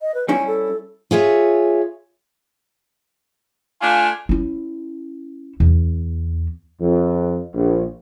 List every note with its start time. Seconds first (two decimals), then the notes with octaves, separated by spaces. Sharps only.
0.01 D#5
0.14 B4
0.28 G3 C#4 E4 G#5
0.47 A4
1.11 F4 G#4 C#5 E5
3.82 A3 D4 F4 G#5
4.29 C#4 E4
5.60 E2
6.80 F2
7.54 A#1